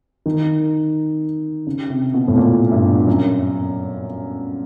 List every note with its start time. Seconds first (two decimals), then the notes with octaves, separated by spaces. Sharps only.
0.26 D#3
1.67 C#3
1.90 C3
2.14 B2
2.28 A2
2.37 A#2
2.72 G2
3.07 F#2